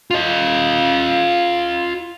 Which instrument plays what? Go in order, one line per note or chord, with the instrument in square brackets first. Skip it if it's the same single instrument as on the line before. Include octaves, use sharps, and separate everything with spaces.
[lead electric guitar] F4 D#5